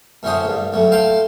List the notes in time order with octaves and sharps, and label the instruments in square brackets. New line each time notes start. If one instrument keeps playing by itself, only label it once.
[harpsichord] F#2 A2 D3 C#4 C5 D#6
A1 G2
D2 A2 F#3
A2 F5 G5 A5 C6